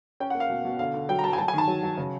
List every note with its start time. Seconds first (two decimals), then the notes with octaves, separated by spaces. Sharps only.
0.20 C#4 G5
0.30 F#5
0.35 A#3
0.40 F5
0.50 B2
0.65 B2
0.79 D3 F5
0.94 D3
1.09 F#3 G5
1.19 A#5
1.24 F#3 A5
1.33 G#5
1.38 F#3 A5
1.48 G#5
1.53 D#3 A5
1.68 F#3
1.83 F#3
1.97 C#3